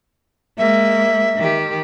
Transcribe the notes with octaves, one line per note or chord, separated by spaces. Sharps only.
G#3 A#3 E5
D#3 G4